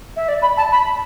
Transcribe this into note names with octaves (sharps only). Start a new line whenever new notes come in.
E5
D5
B5
A5
B5